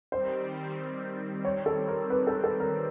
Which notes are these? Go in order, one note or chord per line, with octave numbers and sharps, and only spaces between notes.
D#3 G3 C4 C5
C#5
A4
A#4
B4
A4
A4
A#4